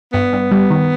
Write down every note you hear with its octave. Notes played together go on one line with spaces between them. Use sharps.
G2 B3
G2
G3
D#3